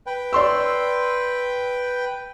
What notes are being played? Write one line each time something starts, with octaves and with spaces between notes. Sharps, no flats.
B4 G5
D5 C6 E6